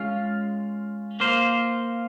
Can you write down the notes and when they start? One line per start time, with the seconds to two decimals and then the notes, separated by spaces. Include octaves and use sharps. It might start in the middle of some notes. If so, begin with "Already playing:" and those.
Already playing: G#3 C#4 F4
1.20 A#3 F4 C5